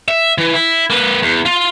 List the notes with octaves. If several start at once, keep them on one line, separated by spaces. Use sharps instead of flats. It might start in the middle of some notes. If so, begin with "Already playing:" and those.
E5
E3
E4
A#3 B4
E2
F4